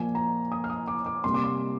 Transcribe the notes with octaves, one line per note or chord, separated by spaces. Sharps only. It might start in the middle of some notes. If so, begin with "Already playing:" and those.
Already playing: A#2 F3 A#3 G#5
A#5
D#6
F6
D#6
D6
D6
C3 G3 A#3 C6
D6
C6